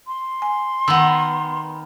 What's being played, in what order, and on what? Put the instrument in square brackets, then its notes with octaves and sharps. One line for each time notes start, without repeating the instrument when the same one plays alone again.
[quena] C6
[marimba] G#5
[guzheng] D#3 B3 [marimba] F#5 E6